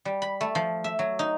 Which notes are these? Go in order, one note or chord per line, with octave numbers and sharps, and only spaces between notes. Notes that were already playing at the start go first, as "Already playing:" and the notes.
G3
B5
A3
F3
E5
F#3
D#4